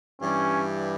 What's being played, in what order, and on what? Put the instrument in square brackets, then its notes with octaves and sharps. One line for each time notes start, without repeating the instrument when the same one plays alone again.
[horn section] G2 E3 G3 [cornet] C#4